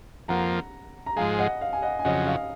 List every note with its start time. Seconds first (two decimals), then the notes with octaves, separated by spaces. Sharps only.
0.28 F2 F3 A#3 F#5 A#5
1.06 A#5
1.16 G#2 F3 G#3 F5 G#5
1.39 D#5 F#5
1.61 F5
1.73 G#5
1.82 D#5 F#5
1.99 G#5
2.05 F2 C#3 F#3 D#5 F#5
2.27 F5